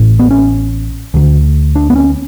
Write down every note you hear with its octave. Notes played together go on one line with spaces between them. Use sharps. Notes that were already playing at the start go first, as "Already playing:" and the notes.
Already playing: A1 A2
B3
C#4
D2 D3
D4
B3
C#4